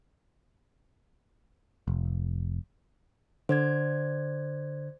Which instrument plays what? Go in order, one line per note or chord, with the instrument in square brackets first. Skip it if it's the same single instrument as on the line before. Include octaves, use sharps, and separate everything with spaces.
[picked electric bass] F1
[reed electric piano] D3 [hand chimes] C5 D5 G#6